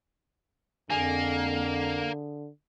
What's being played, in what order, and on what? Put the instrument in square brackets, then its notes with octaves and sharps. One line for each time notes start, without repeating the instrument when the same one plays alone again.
[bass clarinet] F2 [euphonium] D3 [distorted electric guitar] A#3 [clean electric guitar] G#4 G#5